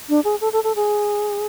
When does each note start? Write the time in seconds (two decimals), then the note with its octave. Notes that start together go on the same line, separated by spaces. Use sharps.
0.09 D4
0.25 G#4
0.41 A4
0.53 A4
0.64 A4
0.76 G#4